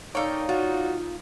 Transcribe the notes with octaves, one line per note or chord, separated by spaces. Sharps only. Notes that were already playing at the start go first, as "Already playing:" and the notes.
D#4 A4 A#4 C#5 D5 F5 G5
F4 F#4